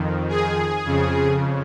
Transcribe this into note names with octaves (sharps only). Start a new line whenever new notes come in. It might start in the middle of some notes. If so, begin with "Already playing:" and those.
Already playing: F2 D#3
G#4
F2 C#3